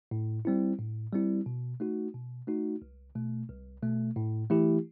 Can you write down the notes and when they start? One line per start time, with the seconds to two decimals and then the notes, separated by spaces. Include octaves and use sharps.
0.11 A2
0.45 G3 C4 E4
0.79 A2
1.13 G3 C4 E4
1.46 B2
1.80 A3 D#4 F#4
2.14 B2
2.47 A3 D#4 F#4
2.82 C2
3.15 B2 A3
3.49 C2
3.83 B2 A3
4.16 A2
4.50 E3 A3 E4 G4